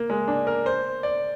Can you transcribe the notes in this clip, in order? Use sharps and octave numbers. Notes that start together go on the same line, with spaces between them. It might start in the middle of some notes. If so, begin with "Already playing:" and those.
Already playing: A#3
G#3
D4
A#4
C5
D5